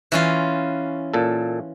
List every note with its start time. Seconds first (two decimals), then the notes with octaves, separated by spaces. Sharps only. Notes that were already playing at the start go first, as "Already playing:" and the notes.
0.12 E3 C#4 F4
1.14 A#2 A4